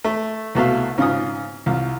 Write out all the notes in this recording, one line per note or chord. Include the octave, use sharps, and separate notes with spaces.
A3
C2 B2 A3 F5
G#2 C#3 F4 G#5 D#6
C2 F4